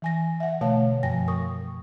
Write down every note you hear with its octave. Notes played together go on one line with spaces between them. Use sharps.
E3 G#5 A#6
E5 F#5
B2 D3 A3 C#5 F5 A5
F#2 F3 G5 G#5 A#6
A#4 C#6 D#6